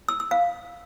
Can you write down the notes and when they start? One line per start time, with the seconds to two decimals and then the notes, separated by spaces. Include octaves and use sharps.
0.08 E6
0.20 E6
0.31 F5